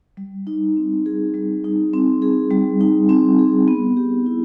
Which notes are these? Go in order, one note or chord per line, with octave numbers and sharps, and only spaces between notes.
G3
D#4
C4
G#4
G3
D#4
C4
G#4
G3
D#4
C4
G#4
B3
G4
E4